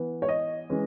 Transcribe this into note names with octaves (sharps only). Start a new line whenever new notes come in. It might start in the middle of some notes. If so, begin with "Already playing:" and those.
Already playing: E3 B3
C#5
D#5
E3 G#3 C#4